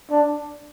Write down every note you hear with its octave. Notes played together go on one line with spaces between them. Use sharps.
D4